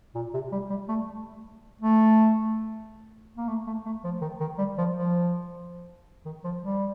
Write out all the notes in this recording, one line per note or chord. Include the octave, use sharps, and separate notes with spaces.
A#2
C3
G3
G3
A3
A3
A#3
A3
A3
A3
F3
D#3
D#3
G3
F3
F3
D#3
F3
G3